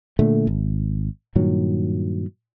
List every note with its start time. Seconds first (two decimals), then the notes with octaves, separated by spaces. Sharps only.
0.19 A#2 D3 A3
0.47 G#1
1.35 G2 A#2 D#3 F#3